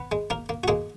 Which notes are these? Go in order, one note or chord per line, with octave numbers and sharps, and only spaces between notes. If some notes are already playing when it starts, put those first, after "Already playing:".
Already playing: B3 B4
G#3
A#3 A#4
A#3
F#4
G#3 A#3 G#4